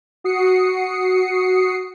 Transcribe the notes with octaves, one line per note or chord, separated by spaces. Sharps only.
F#4 D#6 C7 C#7